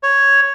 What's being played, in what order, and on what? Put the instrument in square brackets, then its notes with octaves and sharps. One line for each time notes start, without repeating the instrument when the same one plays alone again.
[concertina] C#5